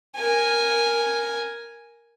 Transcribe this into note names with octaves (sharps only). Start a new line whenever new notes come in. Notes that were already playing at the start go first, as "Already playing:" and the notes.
A#4 G#5